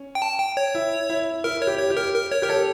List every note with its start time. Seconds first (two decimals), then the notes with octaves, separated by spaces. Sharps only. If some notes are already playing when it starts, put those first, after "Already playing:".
Already playing: C#4
0.15 G5
0.22 A5
0.39 G5
0.57 C#5
0.75 E4
1.10 E4
1.44 E4 A#4
1.62 C#5
1.67 G4
1.79 C#5
1.90 G4
1.97 A#4
2.14 A#4
2.32 C#5
2.42 G4 A#4
2.49 A4 C#5